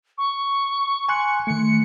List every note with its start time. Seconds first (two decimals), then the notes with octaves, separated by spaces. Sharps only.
0.17 C#6
1.09 G#5 C6 F#6 C#7
1.47 D#3 A3 C#7